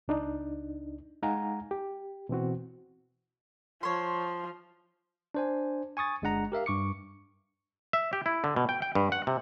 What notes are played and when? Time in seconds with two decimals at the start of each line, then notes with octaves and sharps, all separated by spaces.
0.08 C#2 D4 D#4
1.22 G#3 D#4 F5 F#5 G#5 A#5
1.71 G4
2.29 B2 E3 C4 F#4
3.83 F3 C#5 C6
5.35 D4 C5 G#5
5.97 G#5 C#6 D#6 A6
6.22 G1 G#3 D4 F#5 A#5
6.52 G4 A#4 E5 F5
6.66 G2 C#6 D6 C#7
7.93 E5
8.13 G4
8.26 E4
8.44 D3
8.56 B2
8.69 G5
8.82 G5
8.95 G2
9.12 F#5
9.27 C3